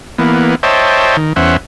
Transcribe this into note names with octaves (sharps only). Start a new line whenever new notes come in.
E3 A#3 B3
C5 C#5 D#5 E5 G5 A5
D#3
E2 C#4 C5 E5 F#5